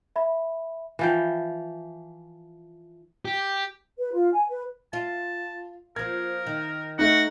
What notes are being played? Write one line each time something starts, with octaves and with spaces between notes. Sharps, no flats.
E5 B5
E3 F3 G5
G4
B4
F4
G#5
B4
F4 A5
F3 A#3 A#4 G#6
D#3
A3 D#4 F#4